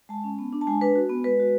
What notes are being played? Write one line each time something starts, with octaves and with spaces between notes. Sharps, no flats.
G#3 A5
C#4
B3
D4
A5
G#3 G#5
D4 B4
F#4
B3
G#3 B4
F#4